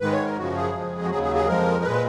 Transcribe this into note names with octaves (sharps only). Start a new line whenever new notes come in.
G#2 D#3 G#3 B4
C#5
A#4
F#2 C#3 F3 F#4
G#4
F2 F3 G#3
F#4
D#2 C#3 F#3 G#4
G#4
G#4
F2 F3 G#3 A#4
A#2 G#3 B4